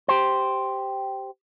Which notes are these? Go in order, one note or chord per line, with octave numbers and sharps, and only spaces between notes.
G4 C5